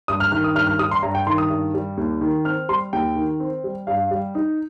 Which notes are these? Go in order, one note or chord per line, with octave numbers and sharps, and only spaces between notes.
G2 D#6
F6
D#3 F6
D#6
G2 F6
F6
G3 D#6
C6
G2 A#5
G5
D#3 C6
D#6
G2
G3
D#2
D#3
C4 F6
G3 C6
D#2 G5
D#3
C4
G3
G2 F5
G3
D#4